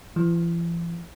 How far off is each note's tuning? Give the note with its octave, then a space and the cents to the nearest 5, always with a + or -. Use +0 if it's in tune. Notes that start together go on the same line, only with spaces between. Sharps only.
E3 +45